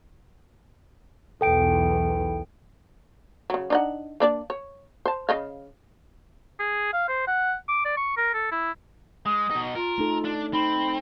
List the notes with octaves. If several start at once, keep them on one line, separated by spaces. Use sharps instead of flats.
B1 E2 E3 A4 G5 D7
C#3 F#3
D4 D#4 F#5
A#3 D4 D5
C#5
C5 A5
C#3 D#5 F5
G#4
F5
C5
F#5
D6
D5
C#6
A#4
A4
E4
G#3 D#6
B2 D#4
F4 A#4
A3 D#4 A4
D4
C4 D#4 B5